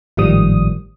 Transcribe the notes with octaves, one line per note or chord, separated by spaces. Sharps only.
G#1 A2 D#3 F3 G3 D#6